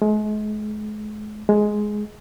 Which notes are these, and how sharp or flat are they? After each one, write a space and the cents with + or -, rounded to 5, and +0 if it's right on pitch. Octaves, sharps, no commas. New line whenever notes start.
G#3 +40
G#3 +10